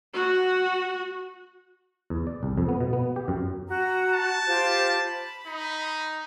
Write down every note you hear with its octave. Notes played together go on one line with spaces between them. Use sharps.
F#4
E2
D5
C2
F2
B3
B2
B3
G4
F#2
F#4 A#5
A5
F4 G4 C5
B5
D#4